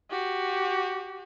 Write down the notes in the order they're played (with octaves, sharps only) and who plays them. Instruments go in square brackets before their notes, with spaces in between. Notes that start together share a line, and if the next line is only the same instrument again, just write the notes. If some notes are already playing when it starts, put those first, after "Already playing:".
[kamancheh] F#4 G4